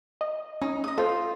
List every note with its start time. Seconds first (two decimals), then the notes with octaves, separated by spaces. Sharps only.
0.21 D#5
0.62 C#4 D#4
0.84 D#5 D#6
0.98 F4 A4 C5